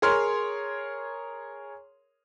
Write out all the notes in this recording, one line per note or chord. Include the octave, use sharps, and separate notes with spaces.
G#4 A#4 C#5 C6 F6